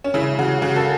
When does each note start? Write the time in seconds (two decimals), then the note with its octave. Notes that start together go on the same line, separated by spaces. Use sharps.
0.04 C#4
0.14 C#3 E4
0.39 C#3 F#4
0.62 C#3 F#4
0.76 A4